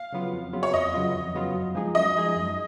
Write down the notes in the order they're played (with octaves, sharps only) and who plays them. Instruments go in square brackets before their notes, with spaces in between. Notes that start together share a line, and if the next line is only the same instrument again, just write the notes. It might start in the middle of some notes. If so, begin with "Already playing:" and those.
Already playing: [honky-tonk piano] F5
[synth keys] C#3 F#3 B3 F4
F2
C#3 F#3 B3 F4
[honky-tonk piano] C#5
[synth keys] F2 [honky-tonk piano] D#5
[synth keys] C#3 F#3 B3 F4
F2
C#3 F#3 B3 F4
F#2
F3 G#3 D#4 G#4
[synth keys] F#2 [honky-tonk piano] D#5
[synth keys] F3 G#3 D#4 G#4
F#2